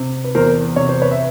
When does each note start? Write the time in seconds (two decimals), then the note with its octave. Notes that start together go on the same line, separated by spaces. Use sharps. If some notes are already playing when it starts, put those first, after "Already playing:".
Already playing: C3
0.24 B4
0.35 E2 A#4 C5
0.76 C3 C#5
0.89 C5
1.01 B4 C#5
1.11 E5